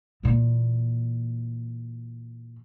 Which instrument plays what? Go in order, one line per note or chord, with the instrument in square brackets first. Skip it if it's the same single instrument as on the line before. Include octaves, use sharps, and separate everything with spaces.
[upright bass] A#2 E3